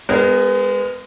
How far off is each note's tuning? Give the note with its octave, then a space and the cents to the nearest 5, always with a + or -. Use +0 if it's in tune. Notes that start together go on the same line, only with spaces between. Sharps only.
G#3 -25 B3 +25 A#4 +0